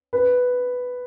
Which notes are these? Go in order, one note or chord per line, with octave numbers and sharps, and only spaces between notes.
B4